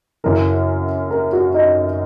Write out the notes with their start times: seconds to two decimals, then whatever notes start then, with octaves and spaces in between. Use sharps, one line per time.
0.24 F#2 C#3 E3 A#4
1.11 A#4
1.33 F#4
1.54 D#4